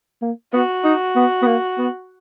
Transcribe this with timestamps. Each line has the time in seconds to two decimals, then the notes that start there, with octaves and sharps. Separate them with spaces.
0.22 A#3
0.53 B3 F#4
0.84 D#4
1.16 B3
1.42 B3
1.46 A#3
1.78 B3